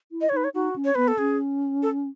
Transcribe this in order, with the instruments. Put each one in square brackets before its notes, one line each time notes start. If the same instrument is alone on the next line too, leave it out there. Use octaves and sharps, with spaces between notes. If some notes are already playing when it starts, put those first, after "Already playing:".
[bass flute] E4
[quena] D#5
C#5
[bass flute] D#4 [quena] B4
[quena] C#5
[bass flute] D#4 [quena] F#4
[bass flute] C#4
[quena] C#5
[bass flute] B3 [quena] B4
[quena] A4
[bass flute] C#4 [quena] G#4
[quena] A4